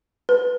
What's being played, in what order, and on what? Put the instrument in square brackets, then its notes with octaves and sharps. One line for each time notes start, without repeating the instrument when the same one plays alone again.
[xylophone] B4